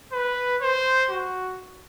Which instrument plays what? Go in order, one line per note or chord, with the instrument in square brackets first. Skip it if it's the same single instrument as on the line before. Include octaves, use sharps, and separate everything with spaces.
[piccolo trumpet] B4
C5
F#4